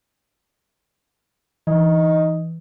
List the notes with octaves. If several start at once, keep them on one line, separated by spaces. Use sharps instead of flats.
E3 D#4